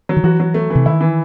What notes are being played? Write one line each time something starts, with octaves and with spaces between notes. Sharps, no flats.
F#3
D#3
E3 F#4
F#3
A3
E3
C3
D#3 E4
E3